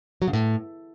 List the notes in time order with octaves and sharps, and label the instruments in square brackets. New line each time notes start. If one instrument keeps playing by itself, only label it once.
[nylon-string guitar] F#3
C#3
A2